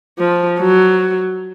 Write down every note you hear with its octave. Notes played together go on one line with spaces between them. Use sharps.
F3
F#3